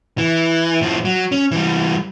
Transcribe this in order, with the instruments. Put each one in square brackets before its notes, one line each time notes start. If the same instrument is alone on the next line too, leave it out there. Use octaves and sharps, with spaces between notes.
[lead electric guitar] E3
A2 F3
F#3
C#4
E3 G3